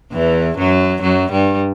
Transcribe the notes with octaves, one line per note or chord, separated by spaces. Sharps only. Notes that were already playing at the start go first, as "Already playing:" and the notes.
E2 E3
F#2 F#3
F#2 F#3
G2 G3